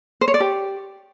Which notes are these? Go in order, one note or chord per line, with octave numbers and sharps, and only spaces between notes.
C5
C#5
D5
G4